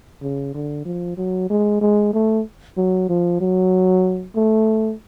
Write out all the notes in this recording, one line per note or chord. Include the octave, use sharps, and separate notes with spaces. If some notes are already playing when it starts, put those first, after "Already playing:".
C#3
D3
F3
F#3
G#3
G#3
A3
F#3
F3
F#3
A3